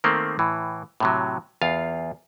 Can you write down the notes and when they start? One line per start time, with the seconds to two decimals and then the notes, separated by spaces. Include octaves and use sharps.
0.04 D#3 A3 A#3 C4
0.39 A2 E3
1.00 A2 C3 F#3
1.62 E2 F4 F5